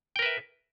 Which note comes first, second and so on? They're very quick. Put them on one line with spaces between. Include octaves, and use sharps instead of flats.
G5 A#4 B4 E5